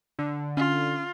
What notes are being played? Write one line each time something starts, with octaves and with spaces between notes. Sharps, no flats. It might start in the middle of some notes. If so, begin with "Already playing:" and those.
D3
C#4 F4